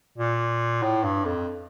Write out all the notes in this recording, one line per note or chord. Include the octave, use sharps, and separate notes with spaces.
A#2
A2
G2
F2